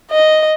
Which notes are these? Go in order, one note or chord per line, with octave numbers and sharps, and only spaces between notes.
D#5